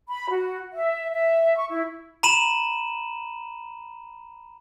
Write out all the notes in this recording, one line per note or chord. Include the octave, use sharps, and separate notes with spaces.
B5
F#4
E5
E5
C#6
E4
A#5 B5 D#7 E7 F#7